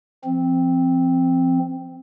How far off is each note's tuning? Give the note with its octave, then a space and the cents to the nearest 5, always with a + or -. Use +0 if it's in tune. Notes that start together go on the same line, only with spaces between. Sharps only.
F3 -30 C4 +0